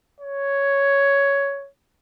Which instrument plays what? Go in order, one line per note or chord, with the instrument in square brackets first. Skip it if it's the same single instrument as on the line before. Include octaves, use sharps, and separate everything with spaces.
[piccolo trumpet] C#5